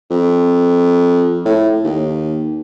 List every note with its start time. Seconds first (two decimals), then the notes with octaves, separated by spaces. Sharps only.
0.10 F2
1.45 A2
1.84 D#2